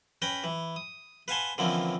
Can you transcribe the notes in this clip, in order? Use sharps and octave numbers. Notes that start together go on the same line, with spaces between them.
C#4 B4 G5 A#5 B5
E3
D#6
B4 F5 F#5 G#5 A5 C6
D3 E3 F3 A#3 C4 C#4